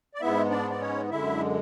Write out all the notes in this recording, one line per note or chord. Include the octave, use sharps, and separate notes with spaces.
D5
G#2 G#3 B3 E4 E5
D4 D5
D5
C#4 C#5
F#2 D3 G#3 E4 E5